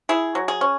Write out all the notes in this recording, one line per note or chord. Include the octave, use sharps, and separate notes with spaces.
E4 G#4
F#3
G#4
C#4